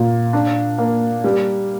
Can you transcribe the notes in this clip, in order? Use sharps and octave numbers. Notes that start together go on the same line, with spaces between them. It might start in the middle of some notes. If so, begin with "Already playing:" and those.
Already playing: A#2
D4
A#3
G3